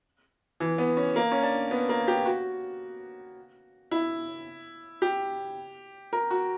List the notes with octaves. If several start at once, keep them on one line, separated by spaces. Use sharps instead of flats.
E3
B3
C#4
A#3
C#4
D4
B3
A#3
G4
F#4
E4
G4
A#4
F#4